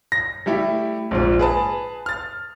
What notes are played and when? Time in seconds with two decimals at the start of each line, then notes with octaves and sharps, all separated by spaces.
0.12 A#6
0.46 G3 A3 E4 G4
1.11 A#1 G#2 F3
1.39 G#4 B4 A5
2.06 F6 A6